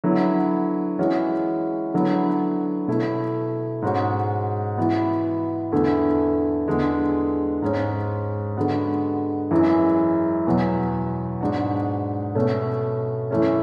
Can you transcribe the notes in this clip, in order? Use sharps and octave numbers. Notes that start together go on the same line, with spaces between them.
D3 F#3 B3 E4
E3 G#3 C#4 F#4
D3 F#3 B3 E4
B2 A3 E4
G#2 G#3 C#4 F#4
E3 B3 F#4
E2 D3 A3 E4
E2 D3 G#3
G#2 G#3 C#4
D3 G#3 B3 F#4
F#2 E3 G#3
E2 B2 F#3
G#2 G#3 D4 F#4
B2 A3 C#4
F#2 E3 A3 C#4